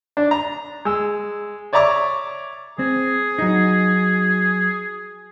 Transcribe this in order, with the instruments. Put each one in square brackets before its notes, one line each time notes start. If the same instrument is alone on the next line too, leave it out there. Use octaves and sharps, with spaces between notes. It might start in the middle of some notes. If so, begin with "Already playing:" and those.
[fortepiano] D4
A#5
G#3 E6
C#5 D5 E5 A#5 C#6 D6
[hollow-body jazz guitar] C4 [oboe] G#4
[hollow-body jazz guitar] F#3 D#4